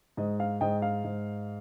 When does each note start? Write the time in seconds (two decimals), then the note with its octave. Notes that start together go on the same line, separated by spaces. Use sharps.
0.17 G#2 D#5
0.40 F5
0.61 G#2 D#5 G5
0.82 F5
1.04 G#2